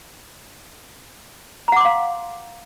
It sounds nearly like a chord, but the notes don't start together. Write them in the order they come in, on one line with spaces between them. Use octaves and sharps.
A#5 F#5 D6 C6 F5